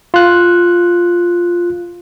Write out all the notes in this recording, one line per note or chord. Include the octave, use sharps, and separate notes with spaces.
F4 F#6